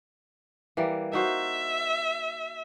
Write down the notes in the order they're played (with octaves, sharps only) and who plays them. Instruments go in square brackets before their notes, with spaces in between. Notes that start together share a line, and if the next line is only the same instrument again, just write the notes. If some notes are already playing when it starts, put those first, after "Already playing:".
[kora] E3 G3 A#3
[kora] D#4 F#4 C5 [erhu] E5